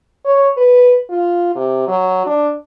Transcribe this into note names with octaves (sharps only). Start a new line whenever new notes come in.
C#5
B4
F4
C3
F#3
D4